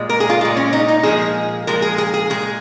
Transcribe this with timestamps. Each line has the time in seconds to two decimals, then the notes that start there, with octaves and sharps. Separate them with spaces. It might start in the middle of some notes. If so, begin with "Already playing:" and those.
Already playing: A#2 G#3
0.09 A#4
0.20 G#4
0.30 F4
0.41 A#2 G#3
0.57 C#4
0.73 D#4
0.88 D#4
1.03 A#2 F3 G#3 G#4
1.67 A#2 F3 G#3 A#4
1.82 G#4
1.98 G#4
2.14 G#4
2.30 A#2 G#3 G#4